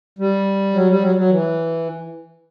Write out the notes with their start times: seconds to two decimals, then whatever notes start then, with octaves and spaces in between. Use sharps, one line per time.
0.19 G3
0.73 F#3
0.88 G3
1.02 F#3
1.16 F#3
1.30 E3